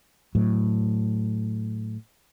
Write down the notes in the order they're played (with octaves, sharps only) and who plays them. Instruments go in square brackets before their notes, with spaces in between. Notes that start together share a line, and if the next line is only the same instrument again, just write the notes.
[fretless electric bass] A2 F#3